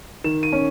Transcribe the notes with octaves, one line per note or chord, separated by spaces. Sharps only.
D#3 E7
D#7
C#4